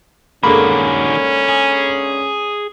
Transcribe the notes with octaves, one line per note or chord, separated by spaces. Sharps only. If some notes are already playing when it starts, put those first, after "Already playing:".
D3 D#3 G#3 A#3 C#4 F#4 B5
G#4